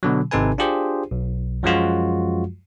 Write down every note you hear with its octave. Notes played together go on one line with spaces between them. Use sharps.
B2 D3 F#3
G#1 C3 D#4 A4 B4 G#5
D4 F4 G4 G#4 C5
B1
F#2 F3 F#3 G#3 F4 F#4